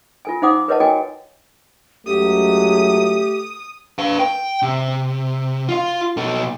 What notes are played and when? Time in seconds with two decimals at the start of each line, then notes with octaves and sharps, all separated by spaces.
0.25 F4 A4 G#5
0.42 D#4 C5 F5 F#5 D6 D#6
0.68 A#4 B4 C#5 D#5 F#5 A5
0.80 F#4 A4 D#5 G5 G#5
2.07 C#2 F#3 A3 G4 D#6
3.99 B4 F5
4.19 G5
4.62 C3
5.68 F4 F5
6.17 B2 A4